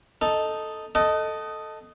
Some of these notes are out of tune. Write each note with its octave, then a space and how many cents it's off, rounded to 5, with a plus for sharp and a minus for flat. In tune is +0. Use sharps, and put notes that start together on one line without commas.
D#4 +0 A4 +0
A4 +5 D#5 +0 F#5 +45